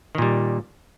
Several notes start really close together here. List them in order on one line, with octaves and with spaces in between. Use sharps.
D#3 A#2 G3